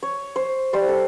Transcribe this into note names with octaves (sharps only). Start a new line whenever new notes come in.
C#5
C5
G3 C5 D5
A4